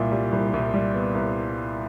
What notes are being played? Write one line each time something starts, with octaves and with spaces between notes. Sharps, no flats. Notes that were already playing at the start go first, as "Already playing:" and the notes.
Already playing: C2 A#2
G3
C2
C2
G3
B3
C2